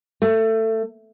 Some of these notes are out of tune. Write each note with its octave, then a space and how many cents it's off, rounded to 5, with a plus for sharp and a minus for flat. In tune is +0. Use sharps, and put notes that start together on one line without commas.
A3 +20